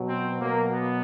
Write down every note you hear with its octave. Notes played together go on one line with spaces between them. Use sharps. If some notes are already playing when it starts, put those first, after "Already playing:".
Already playing: B2 F#3
C4
B2 F#3 A#3
B3